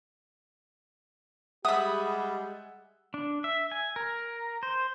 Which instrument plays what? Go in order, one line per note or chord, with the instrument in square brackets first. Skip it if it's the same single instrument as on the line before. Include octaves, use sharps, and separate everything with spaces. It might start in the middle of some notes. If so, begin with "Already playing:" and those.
[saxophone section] G3 G#3 G#4 [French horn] G4 [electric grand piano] E5 F#5 [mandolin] B5 D#6
[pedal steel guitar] D4
E5
G#5
A#4
C5